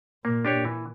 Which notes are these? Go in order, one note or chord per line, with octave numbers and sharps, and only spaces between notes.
A#2 A#3
D4 G4 C#5
E3